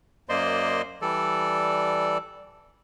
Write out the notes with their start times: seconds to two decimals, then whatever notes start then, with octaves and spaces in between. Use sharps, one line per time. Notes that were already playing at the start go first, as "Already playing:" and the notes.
0.29 F#2 A#3 C5 D5 D#5 C6
1.02 E3 G3 A4 D5